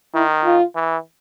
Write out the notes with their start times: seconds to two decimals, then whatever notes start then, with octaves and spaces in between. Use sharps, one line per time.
0.14 D#3 E4
0.45 F4
0.75 E3